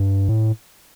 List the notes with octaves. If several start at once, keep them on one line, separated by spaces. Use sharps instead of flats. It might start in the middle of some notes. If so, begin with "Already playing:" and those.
Already playing: G2
A2